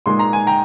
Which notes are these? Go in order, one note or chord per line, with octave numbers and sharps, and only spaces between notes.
A#2 G#3 D#4 C6
A#5
G#5
G5 A#5